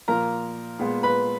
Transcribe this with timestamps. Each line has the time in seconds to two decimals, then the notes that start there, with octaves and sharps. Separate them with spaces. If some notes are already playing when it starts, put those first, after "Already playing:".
0.08 A#2 F3 A#3 A#4 A#5
0.79 A#2 G#3 B3
1.03 B4 B5